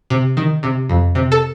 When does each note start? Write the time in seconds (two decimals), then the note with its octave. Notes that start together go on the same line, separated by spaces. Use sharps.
0.10 C3
0.37 D#3
0.63 C3
0.89 F2
1.15 C3
1.32 A4